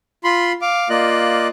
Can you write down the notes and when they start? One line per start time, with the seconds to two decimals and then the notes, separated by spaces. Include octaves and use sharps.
0.24 F4 B5 C6
0.61 F5 D6
0.90 A#3 F4 D5 D#5 F#6